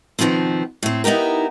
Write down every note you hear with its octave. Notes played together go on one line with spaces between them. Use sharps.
B2 D#3 F3 B3 C4
A2 C4
B3 D#4 E4 G4 A#4